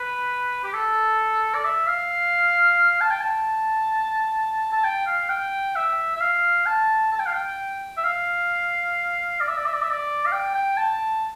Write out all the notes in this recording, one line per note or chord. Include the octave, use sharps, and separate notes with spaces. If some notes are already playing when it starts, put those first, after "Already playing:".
Already playing: B4
G4
A4
D5
E5
F5
A5
G5
A5
A5
G5
F5
G5
E5
E5
F5
A5
A5
G5
F5
G5
E5
F5
D5
E5
D5
E5
D5
E5
D5
F5
G5
G5
A5